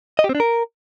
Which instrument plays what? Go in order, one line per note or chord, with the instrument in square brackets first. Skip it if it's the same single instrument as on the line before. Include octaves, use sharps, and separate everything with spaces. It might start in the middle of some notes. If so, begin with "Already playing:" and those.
[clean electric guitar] D#5
G4
C4
D4
A#4